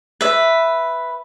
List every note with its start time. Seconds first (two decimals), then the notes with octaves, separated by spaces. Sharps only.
0.21 B4 E5